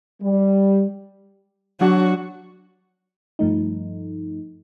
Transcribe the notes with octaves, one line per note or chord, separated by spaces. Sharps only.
G3
F#3 D4 F#4
G2 F3 A3 D#4